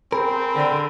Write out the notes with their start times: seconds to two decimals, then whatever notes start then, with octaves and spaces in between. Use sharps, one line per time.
0.12 C4 G#4 A#4 B5
0.56 D3